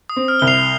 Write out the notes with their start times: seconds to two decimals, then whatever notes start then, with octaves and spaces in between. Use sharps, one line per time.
0.09 D#6
0.16 C4
0.28 F6
0.40 C2 G7
0.47 C7 F7